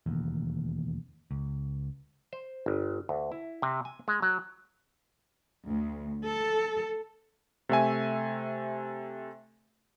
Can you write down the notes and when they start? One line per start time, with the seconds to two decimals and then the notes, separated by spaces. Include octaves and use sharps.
0.06 E1 A1 D#2
1.31 C#2
2.33 C5
2.66 G1
3.09 D2
3.32 E4
3.62 C3
3.85 G#5
4.08 G#3
4.22 F#3
5.68 D2
6.25 A4
7.69 C3 A3 E5 G#5